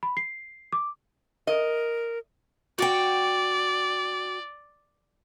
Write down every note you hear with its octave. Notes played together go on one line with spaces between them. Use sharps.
B5
C7
D6
A#4 D#5
F#4 D5 F#5 G5